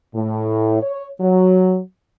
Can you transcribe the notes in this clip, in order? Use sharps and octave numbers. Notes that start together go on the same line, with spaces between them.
A2
C#5
F#3